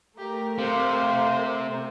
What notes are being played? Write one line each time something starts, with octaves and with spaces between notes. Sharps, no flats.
A3 G4 A#4
C3 C5 F5